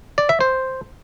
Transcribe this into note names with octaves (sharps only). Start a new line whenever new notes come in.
D5
E5
C5